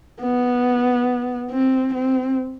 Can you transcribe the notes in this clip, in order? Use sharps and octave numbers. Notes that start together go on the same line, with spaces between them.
B3
C4
C4